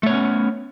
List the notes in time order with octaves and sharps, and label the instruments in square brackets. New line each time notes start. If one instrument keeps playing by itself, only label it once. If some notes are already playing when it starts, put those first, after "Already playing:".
[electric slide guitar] A3
C#5
B3
C#4